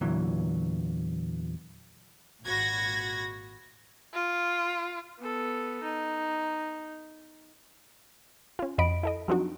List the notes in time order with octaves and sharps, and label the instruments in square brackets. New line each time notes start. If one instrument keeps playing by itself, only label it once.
[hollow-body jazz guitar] E2 A#2 D3 E3 F#3
[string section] G#1 A#2 F#4 B5 G#6 A#6
[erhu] F4
[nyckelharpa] B3 A4
D#4
[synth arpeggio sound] C#4 F4
F2 C#4 F#4 D#5 B5 D7
E4 A4 D#5
F3 F#3 C4 D4 D#4 F#4